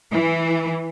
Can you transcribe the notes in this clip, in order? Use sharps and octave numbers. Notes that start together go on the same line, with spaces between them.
E3